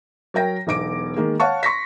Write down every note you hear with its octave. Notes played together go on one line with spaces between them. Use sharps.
F#3 A#4 G5 A#6
E1 B1 D6 D7
D#3 G#3 A#3
C#5 F5 F#5 A5 C#6
C6 C#6 A#6 B6